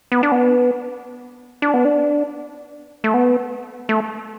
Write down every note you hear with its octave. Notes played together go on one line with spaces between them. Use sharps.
B3
D4
B3
D4
B3
D4
A3
B3
A3